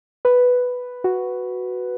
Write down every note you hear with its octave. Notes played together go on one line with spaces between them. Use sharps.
B4
F#4